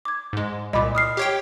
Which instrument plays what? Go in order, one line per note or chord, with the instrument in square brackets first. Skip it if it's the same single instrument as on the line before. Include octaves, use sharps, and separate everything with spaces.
[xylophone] D6 G#6
[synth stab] G#2 G#3
[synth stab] C2 A#2 [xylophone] D#5 B5 D6
[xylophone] D#6 F6 C7
[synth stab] G4 C#5 G5